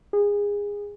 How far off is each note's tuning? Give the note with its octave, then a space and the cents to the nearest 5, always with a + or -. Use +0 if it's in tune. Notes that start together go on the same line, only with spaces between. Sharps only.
G#4 -25